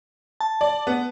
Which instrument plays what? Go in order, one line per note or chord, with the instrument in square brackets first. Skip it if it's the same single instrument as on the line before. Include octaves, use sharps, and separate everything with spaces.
[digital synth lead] A5
[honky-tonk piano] D5
B3